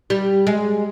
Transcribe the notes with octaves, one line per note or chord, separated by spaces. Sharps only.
G3
G#3